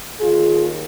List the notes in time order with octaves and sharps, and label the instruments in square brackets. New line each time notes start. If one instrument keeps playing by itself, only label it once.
[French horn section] D#2 D#3 F4 G#4